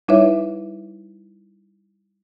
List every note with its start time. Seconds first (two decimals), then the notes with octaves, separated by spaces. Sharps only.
0.08 G3 D#4 E4 B4 C#5 E5